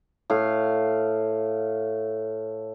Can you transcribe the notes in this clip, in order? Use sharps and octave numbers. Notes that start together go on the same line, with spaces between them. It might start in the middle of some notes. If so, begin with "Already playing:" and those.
A2 F5